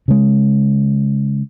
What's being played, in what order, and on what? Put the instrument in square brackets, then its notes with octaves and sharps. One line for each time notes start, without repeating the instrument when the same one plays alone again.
[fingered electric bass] C#3 G#3